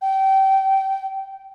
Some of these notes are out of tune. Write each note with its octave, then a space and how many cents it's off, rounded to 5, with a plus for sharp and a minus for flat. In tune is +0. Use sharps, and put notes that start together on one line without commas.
G5 -25